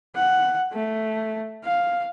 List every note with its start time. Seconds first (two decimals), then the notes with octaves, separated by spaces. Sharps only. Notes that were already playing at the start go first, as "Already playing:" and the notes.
0.15 F#5
0.73 A3
1.64 F5